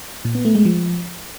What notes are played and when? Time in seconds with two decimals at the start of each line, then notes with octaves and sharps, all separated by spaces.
0.25 A#2
0.35 B3
0.45 A3
0.55 G#3
0.65 F3